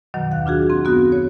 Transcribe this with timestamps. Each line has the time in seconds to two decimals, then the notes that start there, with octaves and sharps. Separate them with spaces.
0.14 F#2 B2 D#3 F#3
0.31 D#2 F5 F#5 F#6
0.46 D4 F4 F#4 G#4
0.70 A3 C4
0.84 F#2 B3 F#4 D#6 A#6
1.12 C#5